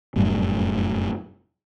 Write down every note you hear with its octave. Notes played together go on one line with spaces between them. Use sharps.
F1 F#2 A2 G3